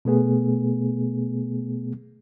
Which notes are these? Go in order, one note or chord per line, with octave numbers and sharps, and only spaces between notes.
B2 A3 B3 G#4